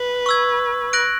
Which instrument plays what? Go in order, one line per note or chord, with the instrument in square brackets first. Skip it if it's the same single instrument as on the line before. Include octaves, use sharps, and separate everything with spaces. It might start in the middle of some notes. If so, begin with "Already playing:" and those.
Already playing: [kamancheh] B4
[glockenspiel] C#6 E6 G#6
F#6 A#6 D7 F#7